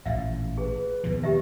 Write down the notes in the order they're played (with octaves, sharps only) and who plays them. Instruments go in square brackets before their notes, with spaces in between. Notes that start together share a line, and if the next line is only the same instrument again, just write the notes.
[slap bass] A1 A#2 [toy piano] E5 F5
[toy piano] G#4 [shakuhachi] B4
[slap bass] D#2 B2 F3
[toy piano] G4 D#5 E5